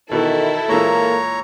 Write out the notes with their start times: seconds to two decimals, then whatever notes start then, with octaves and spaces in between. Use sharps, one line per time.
0.11 B2 D#3 E3 E4 A4
0.69 A#2 E3 G#3 A#3 C#5 A#5